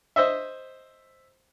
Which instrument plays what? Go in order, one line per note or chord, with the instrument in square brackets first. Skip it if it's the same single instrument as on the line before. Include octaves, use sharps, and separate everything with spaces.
[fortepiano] C5 D#5 E5